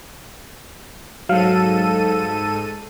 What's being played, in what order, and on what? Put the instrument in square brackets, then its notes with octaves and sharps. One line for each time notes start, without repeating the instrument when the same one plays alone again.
[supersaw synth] G#2 A4 D#7 [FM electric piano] F#3 F5